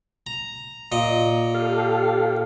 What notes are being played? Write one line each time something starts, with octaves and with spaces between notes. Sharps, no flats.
A#5
A#2 D#5
G4 A4 F5